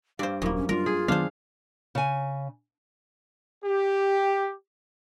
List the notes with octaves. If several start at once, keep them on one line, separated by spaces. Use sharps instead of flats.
G2 C5 D5 F5
D#1 F#2 A#3 E4
C#4
G3 G#3 D4 F4 A#4
G#4
D#3 F#3 B3 D4 C5 F5
C#3 G#5
G4